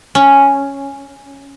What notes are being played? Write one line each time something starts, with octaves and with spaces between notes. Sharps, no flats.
C#4